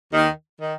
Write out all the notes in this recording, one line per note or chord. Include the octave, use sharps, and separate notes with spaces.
D#2 D#3
D#3